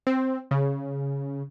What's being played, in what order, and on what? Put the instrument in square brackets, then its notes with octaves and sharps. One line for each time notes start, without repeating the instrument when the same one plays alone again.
[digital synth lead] C4
C#3